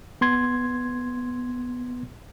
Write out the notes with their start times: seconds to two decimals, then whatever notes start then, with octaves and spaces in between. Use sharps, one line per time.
0.21 B3 C6 G#6